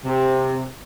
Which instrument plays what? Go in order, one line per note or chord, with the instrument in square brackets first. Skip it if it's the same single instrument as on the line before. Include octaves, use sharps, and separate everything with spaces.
[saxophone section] C3